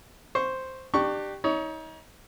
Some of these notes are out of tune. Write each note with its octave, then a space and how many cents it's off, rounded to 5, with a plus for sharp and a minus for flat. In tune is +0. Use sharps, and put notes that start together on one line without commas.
C5 +0 C#6 -5
D4 +30 G4 +0 C#6 +0
D#4 +35 C#5 +20